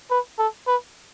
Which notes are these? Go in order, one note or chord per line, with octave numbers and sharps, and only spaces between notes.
B4
A4
B4